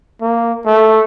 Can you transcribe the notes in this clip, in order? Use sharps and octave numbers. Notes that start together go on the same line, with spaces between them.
A#3
A3